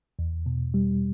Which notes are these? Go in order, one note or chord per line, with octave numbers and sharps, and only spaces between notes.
E2
B2
G3